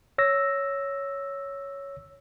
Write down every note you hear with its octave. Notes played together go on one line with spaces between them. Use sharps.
C#5 E6 A#6